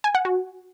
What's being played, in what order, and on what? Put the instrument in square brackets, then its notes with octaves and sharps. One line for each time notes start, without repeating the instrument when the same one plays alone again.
[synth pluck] G#5
F#5
F#4